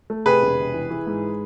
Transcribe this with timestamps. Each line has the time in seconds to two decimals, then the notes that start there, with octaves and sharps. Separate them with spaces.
0.10 A3
0.26 C3 G#4 B4
0.42 E1
0.59 C3
0.74 E3
0.90 E3
1.07 G#2